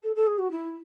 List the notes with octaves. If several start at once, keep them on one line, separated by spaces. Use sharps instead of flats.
A4
A4
G#4
F#4
E4